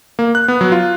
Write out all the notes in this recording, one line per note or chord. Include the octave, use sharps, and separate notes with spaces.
A#3
F#6
B3
F#3
F4